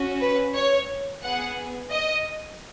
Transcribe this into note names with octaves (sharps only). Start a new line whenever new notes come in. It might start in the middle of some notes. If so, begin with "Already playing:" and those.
Already playing: C#4 F#4
B4
C#5
B3 G#4 F#5
D#5